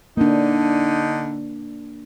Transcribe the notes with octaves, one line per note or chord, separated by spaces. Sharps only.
D3 A#3 D4 D#4